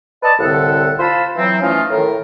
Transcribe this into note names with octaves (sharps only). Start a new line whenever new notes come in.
B4 D5 D#5 A5
C2 A2 D3 C4 A4 F#5
F4 C5 F5 A5 B5
E3 F#3 C4
E3 F3 A3 C#4 D#4 F4
A2 D#3 A#4